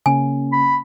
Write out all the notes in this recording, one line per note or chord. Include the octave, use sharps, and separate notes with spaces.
C#3 A#3 C#4 G#5
B5